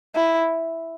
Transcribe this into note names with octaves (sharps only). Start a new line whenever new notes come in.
E4